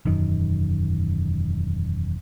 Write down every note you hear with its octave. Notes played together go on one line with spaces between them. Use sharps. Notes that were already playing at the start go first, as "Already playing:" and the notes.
E1 F#2 D#3